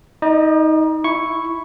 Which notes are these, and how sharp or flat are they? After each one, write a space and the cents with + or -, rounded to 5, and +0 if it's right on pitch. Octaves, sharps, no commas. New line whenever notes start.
D#4 +25 D#5 -40
E4 +0 C#6 +0